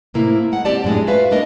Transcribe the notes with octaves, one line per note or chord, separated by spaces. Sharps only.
A2 C3 A#3 E4
G#3 F#5
C4 G4 D5 A5
F#2 A2 G#3 D4 G#4
F4 F#4 B4 E5 F5
G#3 A#3 D4 A#4 D#5